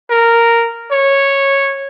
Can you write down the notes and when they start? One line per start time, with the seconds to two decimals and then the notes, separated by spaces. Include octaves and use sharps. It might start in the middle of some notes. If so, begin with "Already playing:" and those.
0.10 A#4
0.91 C#5